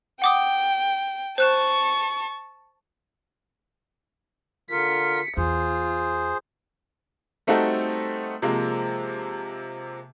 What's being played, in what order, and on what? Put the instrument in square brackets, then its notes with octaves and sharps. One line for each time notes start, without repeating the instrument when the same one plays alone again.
[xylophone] F#5 D6 D#6 [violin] G5
[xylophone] C5 F#6 E7 [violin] A5 C#6
[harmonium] D3 F4 A#4 [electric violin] B6 C#7
[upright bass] E2 [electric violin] F4 [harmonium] G#4 C5
[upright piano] G3 A3 C4 D#4 F#4 A4
C3 F3 G#3 A#3